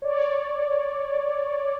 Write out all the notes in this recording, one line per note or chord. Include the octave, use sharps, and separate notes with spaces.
C#5 D5